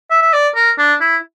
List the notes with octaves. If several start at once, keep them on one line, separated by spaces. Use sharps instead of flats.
E5
E5
D5
A#4
D4
E4